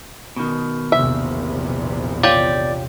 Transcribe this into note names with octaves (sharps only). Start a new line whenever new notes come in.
B2 D#3
A#1 E2 C3 E5
F4 G4 C#5 D5